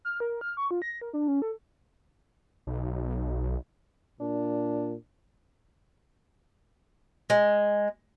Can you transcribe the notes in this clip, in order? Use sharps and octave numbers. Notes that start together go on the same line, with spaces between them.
F6
A#4
F6
C#6
F4
A#6
A#4
D4
C#4
A4
B1
A#2 D4
G#3